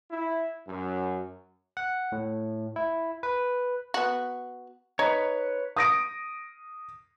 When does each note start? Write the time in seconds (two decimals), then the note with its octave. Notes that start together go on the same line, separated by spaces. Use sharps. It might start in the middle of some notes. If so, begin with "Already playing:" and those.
0.11 E4
0.68 F#2
1.77 F#5
2.12 A2
2.76 E4
3.23 B4
3.94 B3 F#4
4.99 D#4 B4 C#5
5.76 D#6 A#6 D7